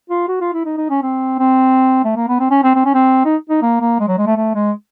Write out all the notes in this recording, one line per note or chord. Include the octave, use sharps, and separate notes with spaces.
F4
F#4
F4
E4
D#4
D#4
C#4
C4
C4
A3
A#3
B3
C4
C#4
C4
C4
C#4
C4
D#4
D#4
A#3
A#3
G#3
F#3
G#3
A3
A3
G#3